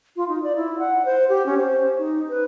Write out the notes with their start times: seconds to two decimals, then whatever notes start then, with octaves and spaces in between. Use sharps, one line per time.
0.16 F4
0.28 D#4
0.43 D5
0.56 E4
0.79 F#5
1.05 C5
1.29 G4
1.46 C#4
1.58 C5
1.98 D#4
2.30 B4